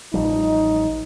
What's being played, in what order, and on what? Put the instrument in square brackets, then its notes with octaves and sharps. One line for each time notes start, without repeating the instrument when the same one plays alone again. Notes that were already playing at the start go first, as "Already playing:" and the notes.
[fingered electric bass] A1 F3 G3 [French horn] D#4